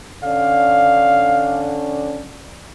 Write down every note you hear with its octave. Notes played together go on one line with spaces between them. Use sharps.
D3 C#4 D4 F5